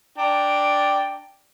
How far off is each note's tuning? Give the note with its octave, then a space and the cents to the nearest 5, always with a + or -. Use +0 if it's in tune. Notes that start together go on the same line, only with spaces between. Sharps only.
D4 +0 G5 +0 A#5 -5